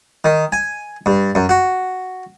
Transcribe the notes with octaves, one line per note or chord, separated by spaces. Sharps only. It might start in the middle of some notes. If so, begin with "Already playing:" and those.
D#3
G#5
G2
F#2
F#4